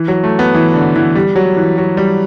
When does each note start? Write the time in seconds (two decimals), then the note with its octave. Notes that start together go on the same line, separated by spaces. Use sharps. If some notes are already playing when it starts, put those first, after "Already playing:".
Already playing: E3
0.08 F#3
0.24 A3
0.39 B3
0.54 E3
0.74 D3
0.96 E3
1.15 G3
1.36 F#3
1.56 E3
1.78 F#3
1.97 G3